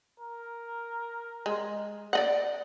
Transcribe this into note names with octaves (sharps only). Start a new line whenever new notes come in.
A#4
G#3
D5 D#5 F#5